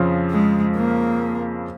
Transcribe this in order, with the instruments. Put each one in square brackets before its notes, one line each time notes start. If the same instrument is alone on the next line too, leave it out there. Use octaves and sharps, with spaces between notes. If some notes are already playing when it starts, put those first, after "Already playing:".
Already playing: [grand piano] F2 C#3 F3
[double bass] G#3
A#3